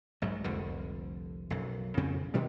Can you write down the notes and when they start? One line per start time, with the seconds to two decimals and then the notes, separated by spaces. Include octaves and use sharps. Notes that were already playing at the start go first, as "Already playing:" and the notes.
0.22 A#1 G#2 F#3
0.44 F1 C2 F2 D3
1.50 B1 F#2
1.97 F2 C#3 C4 C#4
2.34 B2 D#3 G3